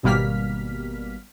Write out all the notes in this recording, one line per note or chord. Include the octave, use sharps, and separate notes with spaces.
G#1 B2 G3 A#3 F6 B6